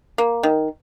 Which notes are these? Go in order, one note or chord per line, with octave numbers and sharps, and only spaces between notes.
A#3
D#3